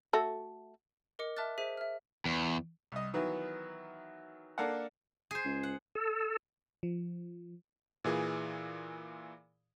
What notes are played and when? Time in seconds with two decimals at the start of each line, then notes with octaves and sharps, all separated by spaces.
0.13 A3 F#4 A4
1.19 A#4 D#5 D6 C#7
1.37 E5 A5 D6 F6 F#6 A6
1.58 G#4 C5 E5 B6 D#7
1.77 E5 F6
2.25 E2
2.92 C2 D#5
3.14 D#3 E3 F#3 B3 E4
4.58 A#3 D4 A4 F5 F#5
5.31 G#4 C5
5.45 C#2
5.63 F#5
5.95 A4
6.83 F3
8.04 A#2 E3 G#4